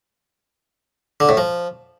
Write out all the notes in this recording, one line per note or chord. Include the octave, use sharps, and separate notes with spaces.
D3
A2
F3